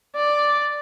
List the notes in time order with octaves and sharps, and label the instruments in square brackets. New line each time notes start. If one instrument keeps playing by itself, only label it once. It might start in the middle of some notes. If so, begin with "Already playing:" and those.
[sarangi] D5